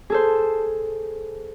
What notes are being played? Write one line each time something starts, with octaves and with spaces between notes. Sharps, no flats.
G#4 A4 C5